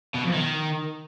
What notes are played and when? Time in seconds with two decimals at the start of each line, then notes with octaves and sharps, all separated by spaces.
0.15 B2
0.24 F2
0.34 D#3